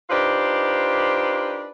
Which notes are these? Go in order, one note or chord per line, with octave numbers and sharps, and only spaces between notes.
D4 D#4 F4 G4 B4 C5